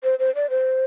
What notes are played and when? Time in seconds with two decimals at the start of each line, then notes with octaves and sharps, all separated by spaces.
0.04 C5
0.19 C5
0.35 D5
0.50 C5